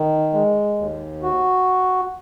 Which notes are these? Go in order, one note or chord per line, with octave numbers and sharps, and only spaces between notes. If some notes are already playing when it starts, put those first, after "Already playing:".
Already playing: D#3
G#3
D#2
F#4